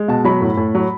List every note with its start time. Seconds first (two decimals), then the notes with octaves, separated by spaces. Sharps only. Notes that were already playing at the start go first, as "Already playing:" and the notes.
Already playing: G#3
0.08 B2 A5
0.25 F#3 B5
0.41 A2
0.57 A2
0.75 F#3